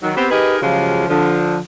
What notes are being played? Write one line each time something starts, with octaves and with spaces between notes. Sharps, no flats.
D#3 F#3
B3 C4 G4
D#4 G4 G#4 A#4 B4 D#5
C#3 F3 F#3 G#3 F4 G4
D3 F3